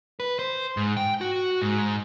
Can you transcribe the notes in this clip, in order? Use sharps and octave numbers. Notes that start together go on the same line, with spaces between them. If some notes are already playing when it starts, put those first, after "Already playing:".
B4
C5
G#2
G5
F#4
G#2